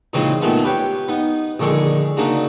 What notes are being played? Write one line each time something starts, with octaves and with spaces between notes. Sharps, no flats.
A#2 C#3 E3 G#3 C4 D#4
A#2 D#3 G#3 A3 B3
G4 B4 C#5 G5
B3 D#4
A#1 D3 D#3 G#3 G#4 C#6
C#3 F#3 A#3 D4 D#4